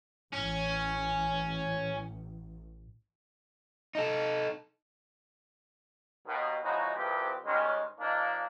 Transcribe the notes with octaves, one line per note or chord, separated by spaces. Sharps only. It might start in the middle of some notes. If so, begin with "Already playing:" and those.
A1 C#4
D#4 A4
D#2 B2 D#3
F3 F#3 G#3 D#4 E4 F#4
C2 F3 C4 G4 G#4 B4
G#2 D#3 G3 G#3 C#4
F3 A#3 D4 D#4